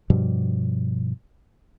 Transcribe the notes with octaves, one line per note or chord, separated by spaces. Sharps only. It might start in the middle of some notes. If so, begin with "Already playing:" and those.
G2 B2 F3 G3